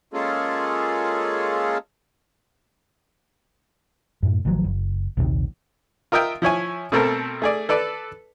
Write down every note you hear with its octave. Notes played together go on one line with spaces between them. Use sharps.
G#3 A#3 C#4 F4 G#4 A4
F#2 A2
A1 D#3 F3 F#3
F#1
A#1 D#2 C3 D#3
F4 A#4 D#5 E5 G5
F3 E4 C#5 G#5
B2 A3 C4 A4 A#4
A3 G#4 D5
A4 B4 D5